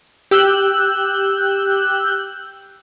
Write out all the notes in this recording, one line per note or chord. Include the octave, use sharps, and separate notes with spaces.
G4 E6 F#6 G6